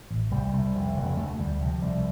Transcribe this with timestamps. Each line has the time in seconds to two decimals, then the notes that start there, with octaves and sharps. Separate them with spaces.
0.11 A1
0.31 C2 G3
0.53 C2
0.75 F1
0.96 F1
1.17 D2 A3
1.39 D2 G3
1.61 C3 F3
1.82 C2